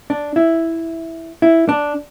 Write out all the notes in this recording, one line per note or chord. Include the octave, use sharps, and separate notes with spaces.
D4
E4
E4
D4